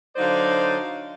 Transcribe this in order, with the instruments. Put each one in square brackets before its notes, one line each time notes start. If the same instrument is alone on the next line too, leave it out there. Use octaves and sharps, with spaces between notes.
[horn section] D3 F#3 D#4 C5 D5 F5